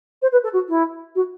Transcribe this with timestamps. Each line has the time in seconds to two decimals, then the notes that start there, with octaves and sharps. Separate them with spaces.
0.22 C5
0.32 B4
0.43 A4
0.53 F#4
0.68 E4
1.15 F#4